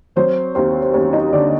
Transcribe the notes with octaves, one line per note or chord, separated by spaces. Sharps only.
F#3 C4 C5
D#2 C4 C5
C5
D#2 C#4 C#5
D#4 D#5
D3 D4 D5